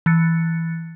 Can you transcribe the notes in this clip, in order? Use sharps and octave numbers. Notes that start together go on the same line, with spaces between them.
E3 F#6 A6 C#7